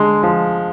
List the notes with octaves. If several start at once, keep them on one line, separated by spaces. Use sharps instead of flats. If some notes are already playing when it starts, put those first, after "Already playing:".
Already playing: D3 G#3
F3